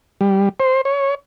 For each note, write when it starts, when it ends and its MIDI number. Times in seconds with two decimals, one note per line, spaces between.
0.21 0.49 55
0.60 0.81 72
0.85 1.15 73